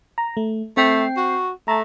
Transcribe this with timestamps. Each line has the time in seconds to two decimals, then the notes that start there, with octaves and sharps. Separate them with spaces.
0.18 A#5
0.37 A3
0.77 A3 C4 G5 C7
1.17 F#4
1.68 A3 A5 A#5